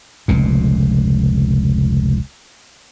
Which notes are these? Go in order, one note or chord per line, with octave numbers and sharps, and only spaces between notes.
F1 C#2 A#2